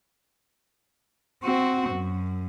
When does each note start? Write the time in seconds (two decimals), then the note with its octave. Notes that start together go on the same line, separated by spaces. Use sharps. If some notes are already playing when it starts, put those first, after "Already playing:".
1.43 C4 F#4
1.90 F#2